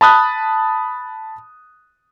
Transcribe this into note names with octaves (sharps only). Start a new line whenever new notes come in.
A5 B5 D#6 F#6